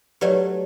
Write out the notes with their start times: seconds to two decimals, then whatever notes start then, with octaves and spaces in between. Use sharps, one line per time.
0.21 F#3 A3 G4 B4 D5